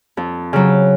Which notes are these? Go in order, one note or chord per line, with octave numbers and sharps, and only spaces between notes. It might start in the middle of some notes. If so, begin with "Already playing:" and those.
F2
C#3 F#3